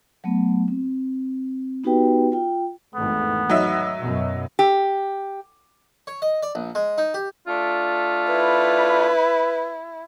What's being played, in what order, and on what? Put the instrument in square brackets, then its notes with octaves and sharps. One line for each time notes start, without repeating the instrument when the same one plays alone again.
[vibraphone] F#3 A3 B3
C4
B3 D#4 F#4 G4 B4 G5
F4 G5
[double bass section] G#1 E2 A3 [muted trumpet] B3
[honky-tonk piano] F#3 D#4 E5
[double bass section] F#2 B2
[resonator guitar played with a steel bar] G4
[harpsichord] C#5
D#5
D5
A#1
G#3
D#4
G4
[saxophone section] A3 D4 F4
[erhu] E4 [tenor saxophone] B4